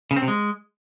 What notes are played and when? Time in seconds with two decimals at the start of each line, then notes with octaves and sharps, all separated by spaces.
0.11 C#3
0.16 C4
0.22 C3
0.28 G#3